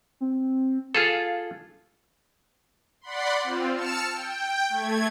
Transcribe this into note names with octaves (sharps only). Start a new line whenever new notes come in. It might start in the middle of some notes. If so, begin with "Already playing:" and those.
C4
F4 G#4 A4 F5
D5 F#5 B5 C6
C4 F4
A5 E6 F6 C#7 E7
G5
A3 G#6